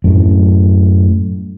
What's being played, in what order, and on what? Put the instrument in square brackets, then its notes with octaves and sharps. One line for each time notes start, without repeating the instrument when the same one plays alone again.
[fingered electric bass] F#2 A2